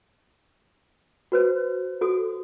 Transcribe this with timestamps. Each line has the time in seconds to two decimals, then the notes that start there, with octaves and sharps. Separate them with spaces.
1.32 F#4 B4 C5
2.01 F#4 A4 D#6